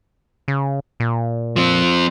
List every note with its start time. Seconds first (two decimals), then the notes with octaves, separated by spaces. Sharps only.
0.48 C#3
1.00 A#2
1.56 F3 C4